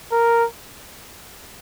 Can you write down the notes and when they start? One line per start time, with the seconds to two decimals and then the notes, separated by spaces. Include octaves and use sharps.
0.12 A#4